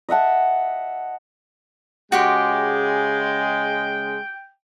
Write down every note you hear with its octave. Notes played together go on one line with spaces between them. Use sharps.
D#5 E5 F#5 A5
C#3 G#3 F#4 G4 G5 C6